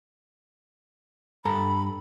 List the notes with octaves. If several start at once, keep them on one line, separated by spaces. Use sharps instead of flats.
G2 A4 A#5 B5